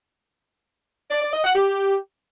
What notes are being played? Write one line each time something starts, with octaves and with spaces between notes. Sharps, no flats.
D5
D5
D#5
F#5
G4